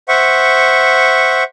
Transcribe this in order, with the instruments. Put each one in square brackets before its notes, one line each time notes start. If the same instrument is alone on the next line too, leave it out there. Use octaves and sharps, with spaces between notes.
[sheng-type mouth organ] C5 E5 F#5 C#6